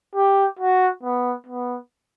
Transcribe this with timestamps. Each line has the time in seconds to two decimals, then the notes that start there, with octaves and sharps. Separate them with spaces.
0.15 G4
0.59 F#4
1.03 B3
1.47 B3